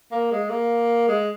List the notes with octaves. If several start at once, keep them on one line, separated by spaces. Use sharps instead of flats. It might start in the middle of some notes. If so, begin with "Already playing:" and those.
A#3
G#3
A#3
G#3